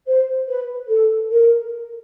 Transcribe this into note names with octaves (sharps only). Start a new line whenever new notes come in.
C5
B4
A4
A#4